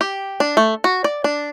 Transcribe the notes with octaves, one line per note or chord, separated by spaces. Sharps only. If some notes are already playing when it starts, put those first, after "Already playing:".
G4
D4
A3
F#4
D5
D4